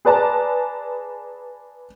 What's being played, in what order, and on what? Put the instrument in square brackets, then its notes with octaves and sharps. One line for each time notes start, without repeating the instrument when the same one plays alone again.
[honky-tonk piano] G#4 B4 D5 A5 A#5